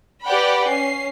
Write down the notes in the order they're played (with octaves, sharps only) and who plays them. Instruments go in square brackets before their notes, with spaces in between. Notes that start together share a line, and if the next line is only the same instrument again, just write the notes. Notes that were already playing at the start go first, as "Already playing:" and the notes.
[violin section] G4 B4 D5 F#5 G5 B5
C#4 C7